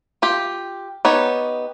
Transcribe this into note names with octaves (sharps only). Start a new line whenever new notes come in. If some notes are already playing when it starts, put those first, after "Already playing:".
F4 G4
B3 D#4 G4 C#5